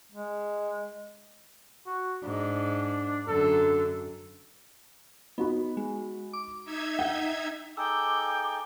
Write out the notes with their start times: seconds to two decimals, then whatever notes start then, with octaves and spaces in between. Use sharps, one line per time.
0.11 G#3
1.86 F#4
2.24 G#2 D4
3.27 F#2 D3 F#3 A4
5.38 B3 D#4 F#4 B5
5.77 G#3
6.33 D6
6.64 D#4 E5 G#6
6.99 F#5 G5
7.77 D#4 G#4 A4 G5 D6 E6